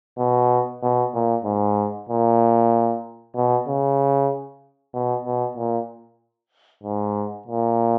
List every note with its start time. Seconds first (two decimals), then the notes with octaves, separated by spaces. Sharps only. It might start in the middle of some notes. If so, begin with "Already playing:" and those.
0.18 B2
0.82 B2
1.14 A#2
1.45 G#2
2.09 A#2
3.35 B2
3.67 C#3
4.94 B2
5.24 B2
5.57 A#2
6.83 G#2
7.47 A#2